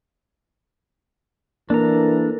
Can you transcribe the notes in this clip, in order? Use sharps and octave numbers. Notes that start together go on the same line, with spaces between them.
E3 A#3 D4 A4 A#4 A#5